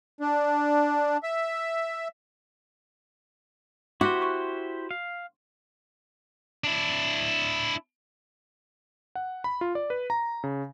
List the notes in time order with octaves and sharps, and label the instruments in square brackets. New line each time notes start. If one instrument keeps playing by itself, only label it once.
[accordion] D4
E5
[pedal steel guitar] E4 G4 C5 [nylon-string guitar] F#4 [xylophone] D6
[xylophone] C6 C#6 F#6
[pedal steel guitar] F5
[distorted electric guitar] D4 E4
[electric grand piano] F#5
B5
F4
D5
B4
A#5
C#3